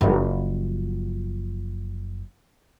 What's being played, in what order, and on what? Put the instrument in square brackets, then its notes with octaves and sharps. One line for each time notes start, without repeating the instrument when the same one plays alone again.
[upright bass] F#1 F3